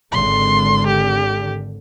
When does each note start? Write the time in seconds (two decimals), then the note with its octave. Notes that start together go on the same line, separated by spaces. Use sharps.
0.12 G#1 D3 C6
0.87 G4